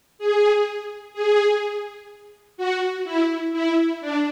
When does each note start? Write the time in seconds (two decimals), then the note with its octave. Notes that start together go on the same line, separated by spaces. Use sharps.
0.19 G#4
1.14 G#4
2.57 F#4
3.05 E4
3.53 E4
4.01 D4